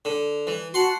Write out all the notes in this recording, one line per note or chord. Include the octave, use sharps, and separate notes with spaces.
D3
E3
F#4 F#5 A5 C6